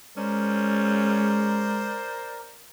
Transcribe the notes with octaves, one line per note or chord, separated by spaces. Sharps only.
G#3 C#4 A#4 C5 D5